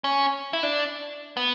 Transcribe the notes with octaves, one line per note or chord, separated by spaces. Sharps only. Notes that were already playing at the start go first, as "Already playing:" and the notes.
C#4
E4
D4
B3